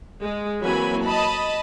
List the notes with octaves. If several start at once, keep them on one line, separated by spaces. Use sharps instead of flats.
G#3
E3 F#3 A#3 C4 G#5 B5
D#5 A5 B5